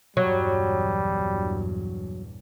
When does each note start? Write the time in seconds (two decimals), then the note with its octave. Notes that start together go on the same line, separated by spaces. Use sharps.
0.17 A#1 E2 G2 F#3 G3